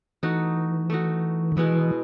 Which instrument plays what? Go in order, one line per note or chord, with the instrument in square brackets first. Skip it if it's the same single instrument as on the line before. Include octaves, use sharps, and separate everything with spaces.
[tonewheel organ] E3 [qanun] A3 D#4 F#4
[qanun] A3 D#4 F#4
[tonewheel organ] D#3
[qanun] B2 G#3 B3 E4 [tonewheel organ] E3